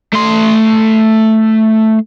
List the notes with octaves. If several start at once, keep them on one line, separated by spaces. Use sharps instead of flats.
A3 C6